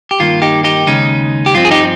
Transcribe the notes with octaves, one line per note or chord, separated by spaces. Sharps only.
G4
G2 D#3 A#3 F4
D#4 G4
D#4 G4
D#2 C#3 G#3 C#4 D#4
G4
G2 F3 C4 F4
G#4
D#4 G4